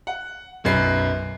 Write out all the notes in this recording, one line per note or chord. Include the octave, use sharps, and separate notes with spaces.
F#5
B1 F#2 B4 C7